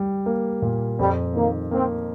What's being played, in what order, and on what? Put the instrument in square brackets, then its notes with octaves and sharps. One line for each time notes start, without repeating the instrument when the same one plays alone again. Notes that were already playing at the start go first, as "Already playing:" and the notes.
Already playing: [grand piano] G3
A#3
A#2
[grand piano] F2 [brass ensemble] G3
[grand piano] D#3 [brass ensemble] A#3
[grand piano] A#3 [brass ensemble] C4